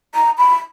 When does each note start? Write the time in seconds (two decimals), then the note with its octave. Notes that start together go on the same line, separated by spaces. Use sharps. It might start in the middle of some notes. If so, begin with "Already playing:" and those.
0.14 A#5
0.38 B5